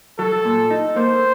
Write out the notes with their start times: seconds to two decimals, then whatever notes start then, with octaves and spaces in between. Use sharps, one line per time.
0.19 F#3 A4
0.45 A#2
0.70 D#4
0.96 A#3 C5